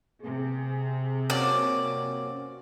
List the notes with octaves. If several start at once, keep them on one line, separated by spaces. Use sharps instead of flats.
C3 G#4
A#3 C4 C#4 F#4 D5